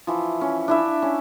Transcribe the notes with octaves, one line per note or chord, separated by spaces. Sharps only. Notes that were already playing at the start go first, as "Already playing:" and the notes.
E3 F3
C#4
D4 E4 E5
C#4